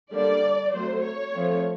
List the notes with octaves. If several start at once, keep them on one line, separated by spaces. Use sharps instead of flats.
D3 G3 A#3 D4 D5
F#3 A3 C4 C5
C#5
F3 A3 C4